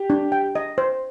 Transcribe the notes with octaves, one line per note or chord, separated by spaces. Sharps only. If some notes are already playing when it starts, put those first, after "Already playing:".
Already playing: G4
D4
G5
D#5
C5